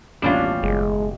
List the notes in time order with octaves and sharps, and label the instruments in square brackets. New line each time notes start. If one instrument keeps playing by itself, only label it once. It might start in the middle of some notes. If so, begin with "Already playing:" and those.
[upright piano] A1 D#2 B2 [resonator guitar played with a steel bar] G3 C#4 F4 [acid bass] D4
[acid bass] F#1 [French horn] G#3